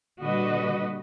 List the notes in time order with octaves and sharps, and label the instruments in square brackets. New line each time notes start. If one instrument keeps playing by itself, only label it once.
[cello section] A#2 D3 G3 F#4 B4 D#5